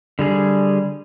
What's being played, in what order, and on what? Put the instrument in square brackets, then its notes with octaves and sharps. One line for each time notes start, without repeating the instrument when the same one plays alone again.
[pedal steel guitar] D3 G3 G#4